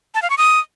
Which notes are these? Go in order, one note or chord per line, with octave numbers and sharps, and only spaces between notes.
A5
F5
C#6
D#6